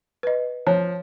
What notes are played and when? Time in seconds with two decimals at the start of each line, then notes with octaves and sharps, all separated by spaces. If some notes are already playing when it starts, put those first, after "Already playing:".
0.23 B4 D#5
0.67 F3 C#5